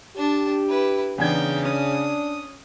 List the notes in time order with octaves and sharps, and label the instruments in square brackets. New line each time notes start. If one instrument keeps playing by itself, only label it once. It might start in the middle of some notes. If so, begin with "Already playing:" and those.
[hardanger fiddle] D4 A5 [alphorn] G4
[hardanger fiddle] E4 B4
[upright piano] E2 D4 G#6 [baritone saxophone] C#3 [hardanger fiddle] D#4 G5
[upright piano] C#4 [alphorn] D4 [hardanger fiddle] D#6